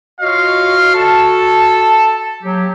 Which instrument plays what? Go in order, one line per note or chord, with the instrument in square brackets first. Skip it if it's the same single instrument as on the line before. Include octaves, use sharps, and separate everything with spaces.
[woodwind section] F4 C#5 D#5 [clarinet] F#4 [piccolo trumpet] F5
[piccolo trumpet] A4 [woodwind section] A5
[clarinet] F#3 [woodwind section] A#3 G4